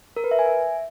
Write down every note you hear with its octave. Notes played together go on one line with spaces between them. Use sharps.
A#4
B4
E5
G#5
E5